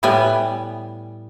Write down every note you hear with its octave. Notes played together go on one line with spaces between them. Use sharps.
A2 G3 B3 G#5